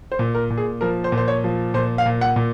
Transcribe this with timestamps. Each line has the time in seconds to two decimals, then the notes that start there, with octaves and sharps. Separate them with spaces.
0.12 C5
0.19 A#2
0.35 A#4
0.50 A#2
0.57 G#4
0.81 F3 A#4
1.04 C5
1.12 A#2
1.17 C5
1.28 C#5
1.44 F3
1.74 A#2 C5
1.98 F5
2.06 A#2
2.21 F#5
2.36 A#2